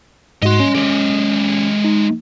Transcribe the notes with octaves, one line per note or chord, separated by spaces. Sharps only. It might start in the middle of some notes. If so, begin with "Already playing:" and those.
G#2 F#4 D#5 C6
C#4
G#3 G4
D#4